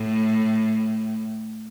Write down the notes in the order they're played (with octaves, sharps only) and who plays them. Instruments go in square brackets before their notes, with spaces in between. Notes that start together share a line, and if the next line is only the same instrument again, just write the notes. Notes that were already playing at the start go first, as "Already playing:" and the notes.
Already playing: [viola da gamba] A2